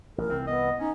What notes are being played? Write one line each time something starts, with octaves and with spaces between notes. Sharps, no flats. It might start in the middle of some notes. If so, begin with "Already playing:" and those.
A1 A#4
C2 E3 C4
B3 D#5
C#4 D#4